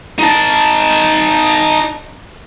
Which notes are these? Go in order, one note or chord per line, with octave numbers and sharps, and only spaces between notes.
D#4 A5